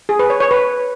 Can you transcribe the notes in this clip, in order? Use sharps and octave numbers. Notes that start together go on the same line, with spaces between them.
G#4
B4
C#5
C#5
B4